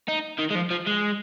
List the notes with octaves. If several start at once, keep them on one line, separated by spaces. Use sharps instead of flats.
D#4
D#3
G#3
F3
F3
G#3